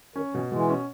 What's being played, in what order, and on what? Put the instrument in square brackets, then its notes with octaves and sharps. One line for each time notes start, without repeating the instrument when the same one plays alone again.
[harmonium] D#3 [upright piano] C#4
[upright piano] B2 [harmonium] E3
[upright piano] B2 [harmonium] E3 G#3
[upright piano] C#4